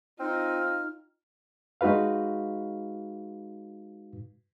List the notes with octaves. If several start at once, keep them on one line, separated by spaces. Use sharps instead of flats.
C4 D#4 F4 F6
G#3 D#4 F#4 B4 F5